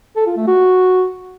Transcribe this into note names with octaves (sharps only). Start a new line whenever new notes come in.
A4
F4
A3
F#4